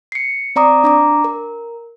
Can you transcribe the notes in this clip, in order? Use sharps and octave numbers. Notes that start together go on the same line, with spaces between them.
C7 C#7
C4 D5 A#5 D6 D#6
D4 A#5 D6
A#4